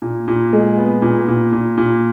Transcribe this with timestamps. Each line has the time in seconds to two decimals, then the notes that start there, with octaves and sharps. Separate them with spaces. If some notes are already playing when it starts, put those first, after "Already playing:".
0.02 A#2
0.28 A#2
0.53 G#3
0.77 B3
1.02 A#2
1.28 A#2
1.52 A#2
1.78 A#2